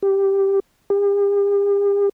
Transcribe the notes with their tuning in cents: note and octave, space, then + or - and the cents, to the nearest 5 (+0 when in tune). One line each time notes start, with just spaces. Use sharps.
G4 +0
G4 +45